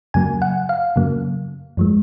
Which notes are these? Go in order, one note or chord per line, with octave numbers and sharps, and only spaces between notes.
F#2 C#3 F#3 A#3 G#5
F#5
F5
F#2 C#3 F#3 A#3
F#2 F3 G#3